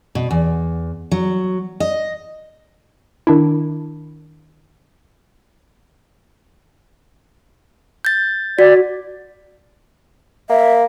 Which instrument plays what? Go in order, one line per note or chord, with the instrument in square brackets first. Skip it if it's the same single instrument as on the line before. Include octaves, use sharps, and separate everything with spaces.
[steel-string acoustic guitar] B2
E2
F#3
D#5
[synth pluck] D#3 D4 E4
[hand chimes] G6 A6
[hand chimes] F#4 [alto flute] D5
[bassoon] A#3 [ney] E5